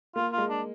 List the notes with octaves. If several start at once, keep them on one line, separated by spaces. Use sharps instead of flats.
A#3 F4
F4
G#3
D4